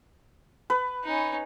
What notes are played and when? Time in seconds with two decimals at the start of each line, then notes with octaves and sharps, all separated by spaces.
0.70 B4
1.04 C#4 D#4